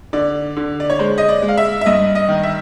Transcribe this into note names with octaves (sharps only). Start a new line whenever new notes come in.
D3 D5
D3
D5
C#5
G#3 C5
D#5
D5
G#3
F5
E5
E5
G2 D#5
D#5
D#3
E5